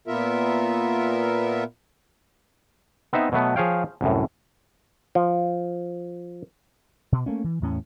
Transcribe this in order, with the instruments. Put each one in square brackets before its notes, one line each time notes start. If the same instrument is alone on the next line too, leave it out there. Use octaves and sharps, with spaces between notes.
[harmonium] A#2 B3 F4 A#4 E5
[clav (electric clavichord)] B3 C4 D#4 E5
B2 F#3 A3 B3
F3 G#4 C#5 F5 G5
C2 F#2 A2
F3
[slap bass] B2
A3 A#3 C#4
E3
E2 A2 C#4